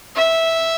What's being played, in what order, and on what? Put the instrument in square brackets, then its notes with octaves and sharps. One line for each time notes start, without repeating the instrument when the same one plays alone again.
[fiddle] E5